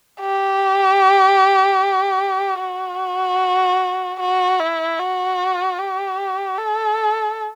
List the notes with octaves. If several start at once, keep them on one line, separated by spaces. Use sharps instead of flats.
G4
F#4
F#4
E4
F#4
G4
A4